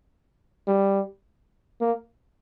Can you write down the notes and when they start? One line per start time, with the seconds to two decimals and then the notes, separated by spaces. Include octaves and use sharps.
0.68 G3
1.81 A#3